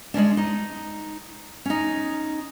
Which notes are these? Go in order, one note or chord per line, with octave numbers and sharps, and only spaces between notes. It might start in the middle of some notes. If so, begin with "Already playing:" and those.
G#3 A#3 C#4 D4
D#4
C#4 D#4